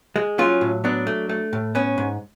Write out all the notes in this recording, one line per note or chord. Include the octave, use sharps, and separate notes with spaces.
G#3
F#3 C#4 F4
A2
F#3 B3 D4
A3
A3
A2
B3 C#4
G#2